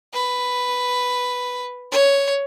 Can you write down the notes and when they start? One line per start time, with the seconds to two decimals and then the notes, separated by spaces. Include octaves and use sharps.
0.13 B4
1.91 C#5